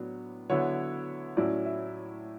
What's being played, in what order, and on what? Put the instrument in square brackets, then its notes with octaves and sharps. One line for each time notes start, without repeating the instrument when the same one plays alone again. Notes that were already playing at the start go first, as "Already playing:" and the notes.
Already playing: [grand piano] A2 F#3 B3 D4
D3 F#3 B3 E4 C#5
A2 F#3 C#4 E4 D5
E5